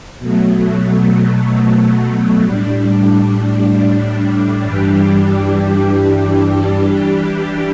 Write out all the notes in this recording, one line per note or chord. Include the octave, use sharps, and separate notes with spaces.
B2 F#3 A3
A2 G3 D4
G2 E3 G3 D4 G4
E3 G3 D4 G4